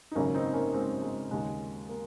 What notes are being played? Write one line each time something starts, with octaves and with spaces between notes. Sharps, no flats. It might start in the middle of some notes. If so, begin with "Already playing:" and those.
D#4
G#1 F#2 C#3 A#3 C#4
C4 D#4
A#3 C#4
G#3 C4
G#3
D#2 C#3 G#3
A#3